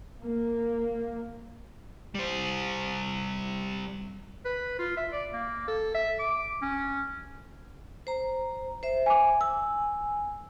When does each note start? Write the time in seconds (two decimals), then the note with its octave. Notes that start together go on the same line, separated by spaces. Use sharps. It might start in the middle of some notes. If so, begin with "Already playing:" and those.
0.21 A#3
2.15 G3 C5
4.45 B4
4.79 F4
4.97 E5
5.13 D5
5.34 A#3
5.68 A4
5.95 E5
6.19 D6
6.62 C#4
8.07 C5 A#5
8.83 C5 E5
9.06 G#5 D6
9.41 G#5 E6